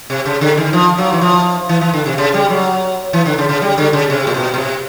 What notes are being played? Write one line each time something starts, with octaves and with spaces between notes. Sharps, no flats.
C3
C#3
D3
D#3
F3
F#3
E3
F3
E3
E3
D3
C3
C#3
G3
F#3
E3
D3
C#3
C#3
G3
D3
C#3
C3
A#2
B2
B2
C3